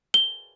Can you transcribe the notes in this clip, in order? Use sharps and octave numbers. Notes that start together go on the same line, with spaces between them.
G7